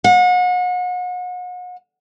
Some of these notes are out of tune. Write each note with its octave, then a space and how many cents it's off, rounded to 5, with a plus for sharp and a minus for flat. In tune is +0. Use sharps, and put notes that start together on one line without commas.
F#5 -35